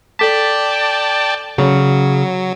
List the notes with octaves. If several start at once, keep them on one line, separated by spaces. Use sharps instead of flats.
A4 D5 G5 A5 D6 B6
C#3 F#3